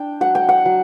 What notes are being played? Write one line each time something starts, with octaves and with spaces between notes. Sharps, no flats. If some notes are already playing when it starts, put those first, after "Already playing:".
Already playing: D4 G5
F#3 F#5
G5
F#5
F#3